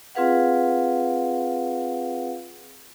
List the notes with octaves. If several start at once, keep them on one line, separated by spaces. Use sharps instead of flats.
C4 F4 G#4 B4 F5 F#5